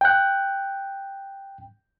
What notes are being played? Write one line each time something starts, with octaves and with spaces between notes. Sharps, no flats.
G5 F#6